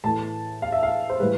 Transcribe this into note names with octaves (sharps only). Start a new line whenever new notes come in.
A2 E3 A3 A5
F5
E5
F5
C5
A2 E3 G3 B4